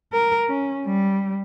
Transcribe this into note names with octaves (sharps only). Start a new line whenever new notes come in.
A#4
C#4
G3